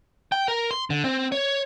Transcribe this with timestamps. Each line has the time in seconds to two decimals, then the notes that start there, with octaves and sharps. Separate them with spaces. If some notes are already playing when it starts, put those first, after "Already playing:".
0.32 G5
0.48 A#4
0.71 C6
0.90 D3
1.04 C4
1.32 C#5